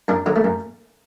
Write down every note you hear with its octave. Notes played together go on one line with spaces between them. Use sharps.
F#2 D4
D3 F#3
A3
F#2